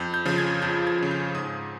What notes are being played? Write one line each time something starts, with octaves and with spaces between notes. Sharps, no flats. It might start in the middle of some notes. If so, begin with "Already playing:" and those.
Already playing: F2 G6
G6
C#3 F3
G#6
F2 G6
G#6
C#3 F3
G6
G#2 D#6